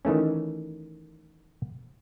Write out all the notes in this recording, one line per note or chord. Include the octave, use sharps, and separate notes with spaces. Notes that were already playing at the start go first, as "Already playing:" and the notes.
D#3 E3 A3 C#4